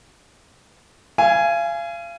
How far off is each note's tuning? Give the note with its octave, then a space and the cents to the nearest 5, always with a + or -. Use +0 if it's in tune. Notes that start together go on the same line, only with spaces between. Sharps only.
F5 -35 G#5 +0